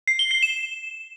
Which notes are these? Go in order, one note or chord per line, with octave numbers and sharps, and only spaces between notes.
C7
G7
C7
E7